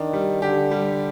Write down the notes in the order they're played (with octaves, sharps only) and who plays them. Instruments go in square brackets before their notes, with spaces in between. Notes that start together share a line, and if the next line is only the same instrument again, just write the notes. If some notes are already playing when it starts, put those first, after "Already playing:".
Already playing: [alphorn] D#3 [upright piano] D4
[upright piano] G3
[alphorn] D3 [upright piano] G4
[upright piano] G3